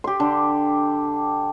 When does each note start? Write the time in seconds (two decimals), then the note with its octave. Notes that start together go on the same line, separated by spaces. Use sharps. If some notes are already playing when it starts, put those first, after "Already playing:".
0.04 G4 C6
0.20 D3